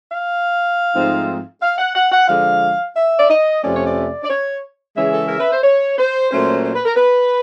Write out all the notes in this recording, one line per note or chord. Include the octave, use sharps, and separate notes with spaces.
F5
G#2 F3 A3 C4 D#4
F5
F#5
F#5
F#5
D3 F3 G#3 F5
E5
D5
D#5
F2 C3 F3 A3 C#4 D5
C#5
D5
D5
C#5
C#3 E3 G#3 C#4 E5
A4
A#4
B4
C5
C#5
C5
A#2 F#3 A3 C#4 C5
C5
B4
A#4
B4